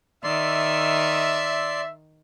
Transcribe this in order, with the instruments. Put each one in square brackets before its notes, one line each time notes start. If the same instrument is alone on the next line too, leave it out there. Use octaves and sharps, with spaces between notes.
[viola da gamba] D#3 [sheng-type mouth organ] D5 C6 [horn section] E5